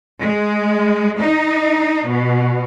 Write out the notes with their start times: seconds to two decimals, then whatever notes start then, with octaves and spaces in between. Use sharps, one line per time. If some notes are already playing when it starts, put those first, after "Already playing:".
0.22 G#3
1.22 D#4
2.09 B2